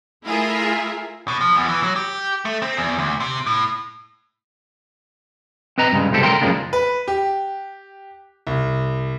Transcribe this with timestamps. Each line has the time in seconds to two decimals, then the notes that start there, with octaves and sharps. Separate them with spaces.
0.25 A3 E4 F4 G#4 A#4 E5
1.28 B2
1.41 F3
1.56 E2
1.69 E3
1.83 F#3
1.96 G4
2.45 A3
2.62 C4
2.77 E2
2.98 D2
3.20 C3
3.47 A2
5.78 C4 B4 D#5 A#5
5.92 G2 C#3 G#3
6.11 C2 G2 G#3 C4 G4 A4
6.23 C#2 D3 A#3 A#4 G5 C6
6.41 F#2 C#3 F3 G#3 A#3 D4
6.73 B4
7.08 G4
8.47 C2